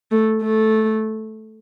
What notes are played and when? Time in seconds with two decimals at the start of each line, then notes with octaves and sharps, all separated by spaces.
0.11 A3
0.42 A3